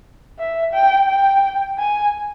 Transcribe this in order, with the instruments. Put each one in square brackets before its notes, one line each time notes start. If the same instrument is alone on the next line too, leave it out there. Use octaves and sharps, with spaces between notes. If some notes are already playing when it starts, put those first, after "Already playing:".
[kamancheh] E5
G5
G5
G#5